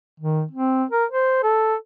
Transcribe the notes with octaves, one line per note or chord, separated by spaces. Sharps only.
D#3
C4
A#4
C5
A4